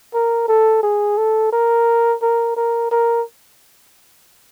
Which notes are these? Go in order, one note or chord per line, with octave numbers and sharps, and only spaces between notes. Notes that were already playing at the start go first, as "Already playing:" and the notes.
A#4
A4
G#4
A4
A#4
A#4
A#4
A#4